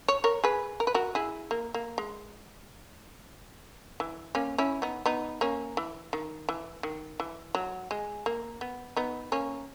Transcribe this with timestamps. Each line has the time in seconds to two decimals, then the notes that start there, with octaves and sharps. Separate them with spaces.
0.08 C#5
0.24 A#4 C#5
0.44 G#4 B4
0.80 A#4
0.87 B4
0.94 F#4 A#4
1.15 E4 G#4
1.51 A#3
1.74 A#3
1.98 G#3
4.00 E3
4.35 A#3 C#4
4.58 C#4 E4
4.82 B3 D#4
5.06 B3 D#4
5.41 A#3 C#4
5.77 E3
6.13 D#3
6.49 E3
6.83 D#3
7.20 E3
7.55 F#3
7.91 G#3
8.26 A#3
8.61 B3
8.97 B3 D#4
9.32 A#3 C#4